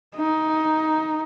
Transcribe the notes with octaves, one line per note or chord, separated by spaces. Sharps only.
D#4